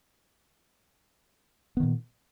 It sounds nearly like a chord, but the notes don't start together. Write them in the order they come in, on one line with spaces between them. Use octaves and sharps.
B3 D#3 A#2